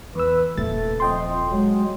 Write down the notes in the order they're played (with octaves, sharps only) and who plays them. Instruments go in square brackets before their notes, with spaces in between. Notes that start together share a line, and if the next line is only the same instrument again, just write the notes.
[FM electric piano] E2 E6 [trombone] B4
[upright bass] D#1 [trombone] A3 [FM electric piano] A6
[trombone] F2 [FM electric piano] D#5 G5 C6
[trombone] F#3 [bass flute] G#3